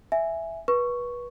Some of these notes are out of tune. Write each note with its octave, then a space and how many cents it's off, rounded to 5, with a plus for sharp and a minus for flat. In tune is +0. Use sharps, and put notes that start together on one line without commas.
E5 +0 G#5 +0
B4 -25 C#6 +0